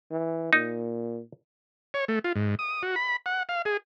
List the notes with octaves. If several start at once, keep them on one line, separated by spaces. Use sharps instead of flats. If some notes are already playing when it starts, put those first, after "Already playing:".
E3
A#2 D#4
C#5
A3
F4
G#2
D#6
F#4
B5
F#5
F5
G#4